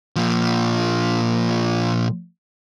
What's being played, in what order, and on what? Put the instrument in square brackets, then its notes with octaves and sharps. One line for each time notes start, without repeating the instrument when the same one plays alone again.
[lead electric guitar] A#2 F3